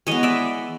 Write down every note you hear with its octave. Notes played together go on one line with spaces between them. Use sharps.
E3 G#3 B3 C#5 D#5
D5 E5